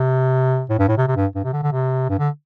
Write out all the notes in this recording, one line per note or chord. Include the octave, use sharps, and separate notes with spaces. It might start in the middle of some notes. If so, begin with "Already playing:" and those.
Already playing: C3
A2
G2
A2
C3
C3
G2
G2
C3
D3
D3
C3
G2
D3